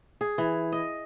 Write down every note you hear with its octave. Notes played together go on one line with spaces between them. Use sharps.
G#4
E3
D#5